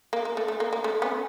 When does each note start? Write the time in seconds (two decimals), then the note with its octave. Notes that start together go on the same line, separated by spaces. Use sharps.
0.13 A#3
0.25 A#3
0.37 A3
0.48 A3
0.60 A#3
0.73 A#3
0.84 A3
1.02 B3 C#4